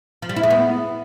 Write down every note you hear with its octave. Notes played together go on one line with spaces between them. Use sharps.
F3
G3
E4
G#3
B3